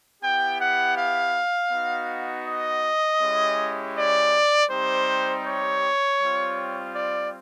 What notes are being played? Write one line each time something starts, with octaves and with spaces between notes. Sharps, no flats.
B3 E4 G4 G5
F#5
F5
B3 D#4 F#4
D#5
G#3 C#4 E4 G4
D5
G3 C4 D#4 G4 C5
C#5
G3 C4 F4
D5